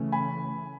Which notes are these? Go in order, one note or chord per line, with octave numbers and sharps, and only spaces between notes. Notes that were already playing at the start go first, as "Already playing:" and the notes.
Already playing: C#3 E3 A3 C#4
G#5 B5